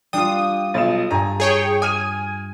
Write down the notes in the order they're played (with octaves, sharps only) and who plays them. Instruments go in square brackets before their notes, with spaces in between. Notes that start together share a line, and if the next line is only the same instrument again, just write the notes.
[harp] G3 F4 [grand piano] D4 G5 [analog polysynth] D#6
[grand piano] B1 F4 E7 [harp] A6
[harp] G2 [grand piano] G#5 A#5
[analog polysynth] G#4 C#5 G5
[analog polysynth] G#5 [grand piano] D#6 F6 D#7